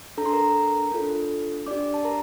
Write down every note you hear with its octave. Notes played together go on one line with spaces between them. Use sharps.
D4 A4 A#5
C6
A#4 A#5
D4 F4 A4
D4 G4 D5 D6
A5
A#4 A#5